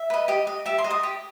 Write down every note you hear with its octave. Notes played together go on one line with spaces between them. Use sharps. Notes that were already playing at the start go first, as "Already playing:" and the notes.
Already playing: E5
B4 D#5
G4 D#5
D#5
G4 E5
C6
D#5
D#6
G4